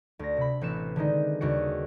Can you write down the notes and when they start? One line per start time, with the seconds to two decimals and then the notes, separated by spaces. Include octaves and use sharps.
0.19 D2 A#6
0.37 C3 B5
0.61 A1 C4 B4 C#7 E7
0.96 D3 D#3 G#3 D#4
1.41 D#2 C#3 G3 F#4 C#7